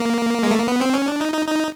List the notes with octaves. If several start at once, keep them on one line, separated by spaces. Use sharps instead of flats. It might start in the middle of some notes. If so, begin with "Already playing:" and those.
Already playing: A#3
G#3
A3
A#3
B3
C4
C#4
D4
D#4
D#4
D#4